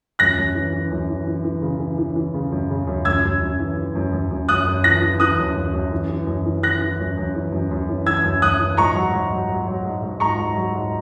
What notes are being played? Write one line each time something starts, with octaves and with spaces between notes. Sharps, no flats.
F#2 F#6 A#6
F#2
E3
E3
F#2
E3
E3
E3
C#3
E3
E3
E3
C#3
F#2
C#3
F#2
F#2 E6 G#6
F#2
F#2
E3
E3
F#2
F#2
F#2
F#2 D#6 F#6
F#2
E3 F#6 A#6
E3
E3 D#6 F#6
F#2
F#2
F#2
E3
E3
F#2
E3
E3 F#6 A#6
E3
F#2
F#2
E3
F#2
F#2
E3
E3 E6 G#6
F#2
F#2 D#6 F#6
E3
G#2 A#5 C#6
F#3
G#2
F#3
F#3
F#3
G#2
G#2
G#2 A#5 C#6
G#2
F#3
G#2